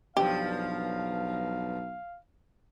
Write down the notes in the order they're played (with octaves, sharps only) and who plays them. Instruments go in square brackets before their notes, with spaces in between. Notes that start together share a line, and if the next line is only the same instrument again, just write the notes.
[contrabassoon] B1 [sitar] G2 F3 [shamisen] G4 [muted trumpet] F5